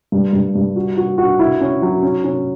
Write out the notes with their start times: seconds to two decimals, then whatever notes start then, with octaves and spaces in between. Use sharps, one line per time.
0.12 G2
0.33 G2
0.55 G2
0.76 F#4
0.97 F#4
1.18 F#4
1.39 E4
1.61 C#4
1.82 F#3
2.03 C#4
2.24 C#4